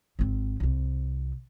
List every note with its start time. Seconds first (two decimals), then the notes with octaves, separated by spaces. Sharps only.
0.19 G#1 C4
0.60 C2 C3